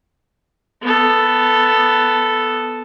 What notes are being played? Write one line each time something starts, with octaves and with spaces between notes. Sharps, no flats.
B3 A4